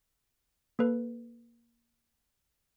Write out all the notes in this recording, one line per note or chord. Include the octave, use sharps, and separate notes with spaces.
A#3 A4 B4